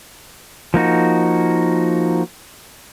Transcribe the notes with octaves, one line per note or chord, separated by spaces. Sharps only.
F3 A#3 D#4 F#4